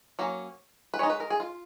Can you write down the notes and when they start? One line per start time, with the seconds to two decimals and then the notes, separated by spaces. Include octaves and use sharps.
0.19 F#3 A#3 C#4
0.94 B4
0.99 G#3 D#4 C#5
1.10 B4
1.20 A#4
1.30 G#4
1.40 F4